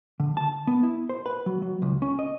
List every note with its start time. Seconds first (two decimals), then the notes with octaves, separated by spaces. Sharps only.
0.20 D3
0.37 A5
0.67 B3
0.83 E4
1.09 C5
1.26 B4
1.46 F#3
1.62 F#3
1.82 C#2
2.02 C#4
2.19 D#5